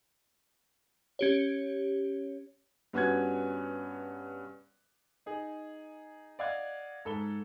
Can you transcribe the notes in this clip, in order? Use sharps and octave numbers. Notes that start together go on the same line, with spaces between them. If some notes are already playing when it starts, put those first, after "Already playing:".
C#4 G4 C#5
G2 B3 C#4 F#4 F#6 G#6
D#4 G#4
D5 D#5 F5 F#5 F#6 G#6
G#2 A4 B5 G7